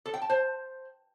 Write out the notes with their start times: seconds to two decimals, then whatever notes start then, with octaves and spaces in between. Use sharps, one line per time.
0.06 A4
0.14 G5
0.22 A5
0.30 C5